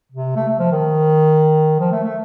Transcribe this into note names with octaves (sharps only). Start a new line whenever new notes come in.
C3
A3
A3
F3
D#3
F3
A3
A3